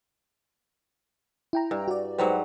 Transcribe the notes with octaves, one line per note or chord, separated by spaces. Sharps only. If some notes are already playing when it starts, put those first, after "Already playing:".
E4 G5 A#5
G2
F#4 D5
G#2 F#3 G3 B4 C5 F#5